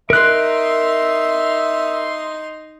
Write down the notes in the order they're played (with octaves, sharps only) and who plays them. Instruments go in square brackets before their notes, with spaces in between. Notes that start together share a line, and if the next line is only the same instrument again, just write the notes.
[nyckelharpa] D#4 C6 [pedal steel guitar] A#4 F#6 [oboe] E5